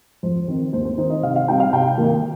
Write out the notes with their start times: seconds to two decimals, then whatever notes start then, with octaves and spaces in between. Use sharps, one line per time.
0.23 F2 C5
0.48 D#3 C4
0.73 D#2 C5
0.85 C5
0.98 D#3 C4 D#4 C5
1.10 D#5
1.23 C3 F5
1.36 F5
1.48 G3 C4 D#4 G5
1.60 F5
1.73 C3 G5
1.98 D#3 A#3 D#4